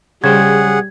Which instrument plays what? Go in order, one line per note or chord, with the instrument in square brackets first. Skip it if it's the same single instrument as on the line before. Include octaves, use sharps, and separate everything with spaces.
[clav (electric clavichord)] C#3 C5 G5 [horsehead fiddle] G3 [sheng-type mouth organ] G#4 F#5 [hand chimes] G#6